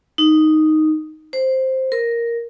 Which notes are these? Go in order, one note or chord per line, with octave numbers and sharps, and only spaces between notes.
D#4
C5
A#4